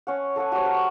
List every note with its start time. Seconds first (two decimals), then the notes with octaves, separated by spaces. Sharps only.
0.07 C#4 F#5
0.36 A4 C#5 F#5 G#5
0.52 F#4 G4 C5 C#5
0.66 A#4